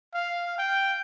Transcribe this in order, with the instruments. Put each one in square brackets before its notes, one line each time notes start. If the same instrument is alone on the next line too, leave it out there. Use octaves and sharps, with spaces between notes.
[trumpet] F5
G5